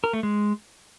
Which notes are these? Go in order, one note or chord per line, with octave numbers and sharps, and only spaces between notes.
A#4
A3
G#3